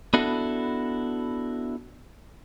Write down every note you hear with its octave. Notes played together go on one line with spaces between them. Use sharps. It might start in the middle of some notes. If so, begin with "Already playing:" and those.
B3 D4 E4 F#4 A4